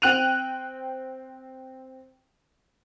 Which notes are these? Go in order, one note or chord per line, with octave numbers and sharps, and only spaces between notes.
C4 G5 F#6 D#7 F7